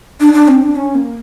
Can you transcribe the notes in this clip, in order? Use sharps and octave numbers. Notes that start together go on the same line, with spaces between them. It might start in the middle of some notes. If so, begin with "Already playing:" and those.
D4
D4
C4
D4
C#4
A#3